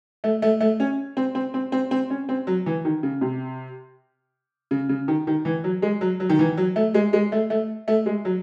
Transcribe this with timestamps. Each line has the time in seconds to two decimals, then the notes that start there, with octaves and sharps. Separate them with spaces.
0.24 A3
0.42 A3
0.60 A3
0.80 C#4
1.17 C4
1.35 C4
1.54 C4
1.72 C4
1.91 C4
2.10 C#4
2.29 C4
2.47 F#3
2.66 E3
2.85 D#3
3.03 C#3
3.21 C3
4.71 C#3
4.89 C#3
5.08 D#3
5.27 D#3
5.45 E3
5.64 F#3
5.82 G#3
6.01 F#3
6.20 F#3
6.29 D#3
6.39 E3
6.57 F#3
6.76 A3
6.94 G#3
7.13 G#3
7.32 A3
7.50 A3
7.88 A3
8.06 G#3
8.25 F#3